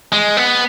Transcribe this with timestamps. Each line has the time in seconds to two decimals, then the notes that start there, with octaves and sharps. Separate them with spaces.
0.12 G#3
0.37 B3